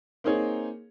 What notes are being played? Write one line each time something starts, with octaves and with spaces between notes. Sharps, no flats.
A#3 C4 D#4 G#4 C#5